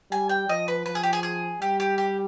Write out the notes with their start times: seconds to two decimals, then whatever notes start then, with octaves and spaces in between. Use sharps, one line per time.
0.11 G3 G#5
0.29 G5
0.49 F3 D#5
0.68 B4
0.86 F3 B4
0.95 G#4
1.03 G4
1.13 G#4
1.23 G#4
1.61 G3 G4
1.80 G4
1.98 G4